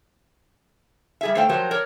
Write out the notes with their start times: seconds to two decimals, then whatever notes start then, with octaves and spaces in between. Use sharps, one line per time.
1.21 G3 G#4 E5
1.35 A3 A4 C5 F5 G5
1.49 F3 F#3 G4 A#4 C5
1.71 A#4 C#5 D5